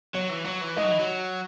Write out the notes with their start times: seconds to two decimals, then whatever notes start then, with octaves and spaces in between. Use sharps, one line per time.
0.14 F#3 C#5
0.30 E3
0.45 F#3 C#5
0.61 E3
0.76 G#3 D#4 D#5
0.84 F#3
0.91 E3
1.00 F#3